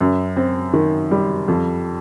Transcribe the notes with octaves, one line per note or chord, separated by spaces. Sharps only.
F#2
C4
D#3
G3
F2